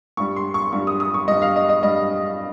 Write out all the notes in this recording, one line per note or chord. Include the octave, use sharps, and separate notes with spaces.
G2 G3 C#6
C6
C#6
G2 G3 C#6
D#6
D#6
C#6
G2 G3 D#5
F5
D#5
D#5
G2 G3 D#5